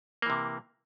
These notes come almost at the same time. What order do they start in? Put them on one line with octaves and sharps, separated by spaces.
A#3 E3 C3